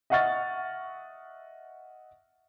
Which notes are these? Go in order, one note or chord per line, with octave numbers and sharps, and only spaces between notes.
D#5 E5 F#5 C#6 F6 A6